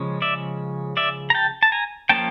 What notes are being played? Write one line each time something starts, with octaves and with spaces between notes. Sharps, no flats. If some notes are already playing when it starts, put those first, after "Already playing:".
Already playing: C#3 F3 G#3 C#4
D5 E5
D5 E5
A#5
G5 A5
A5
G#5 A#5
F3 A#3 C#4 G5 A5